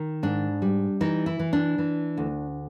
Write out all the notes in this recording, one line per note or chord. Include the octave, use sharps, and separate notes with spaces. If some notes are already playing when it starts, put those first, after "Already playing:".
Already playing: D#3
G#2 D4
G3
E3 D#4
E4
E3
D4
E3
D2